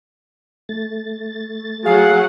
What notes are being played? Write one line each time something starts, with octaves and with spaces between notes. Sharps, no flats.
A3 A6
F#3 G#4 F5 F#5